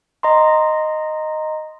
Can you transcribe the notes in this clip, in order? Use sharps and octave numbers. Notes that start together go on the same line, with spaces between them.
D#5 A#5 C6